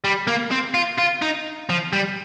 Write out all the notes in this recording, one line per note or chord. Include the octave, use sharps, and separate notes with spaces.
G3
A#3
C4
F4
F4
D#4
F3
G3